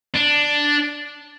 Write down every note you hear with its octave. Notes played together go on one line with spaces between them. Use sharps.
D4